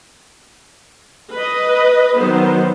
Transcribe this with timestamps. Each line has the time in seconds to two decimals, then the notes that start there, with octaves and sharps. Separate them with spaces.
1.33 B4 D#5
2.16 D#3 F#3 B3 C5